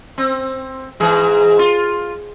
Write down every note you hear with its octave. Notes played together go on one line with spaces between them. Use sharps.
C4
G#2 E3 G#4
F4